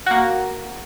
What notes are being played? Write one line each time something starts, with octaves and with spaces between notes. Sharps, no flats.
A#3 F#4